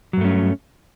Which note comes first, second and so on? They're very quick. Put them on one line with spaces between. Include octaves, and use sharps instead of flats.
F#3 G2 A3 C#4